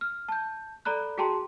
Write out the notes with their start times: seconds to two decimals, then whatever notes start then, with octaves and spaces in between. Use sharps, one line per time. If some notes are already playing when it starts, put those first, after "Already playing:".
0.01 F6
0.28 A5 G6
0.85 A4 D5 A#5 B5 F#6
1.18 F#4 G#4 G5 A5 A#5 C6